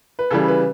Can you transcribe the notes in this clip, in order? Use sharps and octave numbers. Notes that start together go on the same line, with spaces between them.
B4
C#3 E3 G3 A4
B4